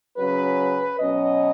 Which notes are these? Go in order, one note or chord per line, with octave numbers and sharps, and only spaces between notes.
C#3 F#3 C#4 B4
B2 F#3 C#4 D#5